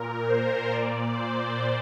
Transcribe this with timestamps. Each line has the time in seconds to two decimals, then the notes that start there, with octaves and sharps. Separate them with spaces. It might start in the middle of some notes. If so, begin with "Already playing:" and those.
Already playing: A#2 A#4
0.28 C5
0.72 A#2 D5
1.15 C5